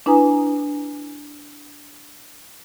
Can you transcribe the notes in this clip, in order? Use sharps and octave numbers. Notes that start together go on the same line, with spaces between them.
D4 E4 B4 G#5 A#5 D#6